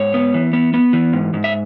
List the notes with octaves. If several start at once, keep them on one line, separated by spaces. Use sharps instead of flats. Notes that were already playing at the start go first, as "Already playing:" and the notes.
Already playing: G#2 C#5
B3
E3
B3
B3
E3
G#2
G#2
E5